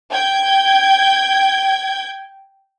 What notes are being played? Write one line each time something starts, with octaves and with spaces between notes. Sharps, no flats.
G5 G6 G#6